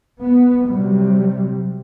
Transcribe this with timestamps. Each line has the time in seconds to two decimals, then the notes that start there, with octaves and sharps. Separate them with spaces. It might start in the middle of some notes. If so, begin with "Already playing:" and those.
0.21 B3
0.69 C3 F#3 G3